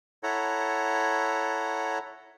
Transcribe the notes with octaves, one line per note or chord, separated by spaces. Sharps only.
E4 A4 C#5 F#5 A#5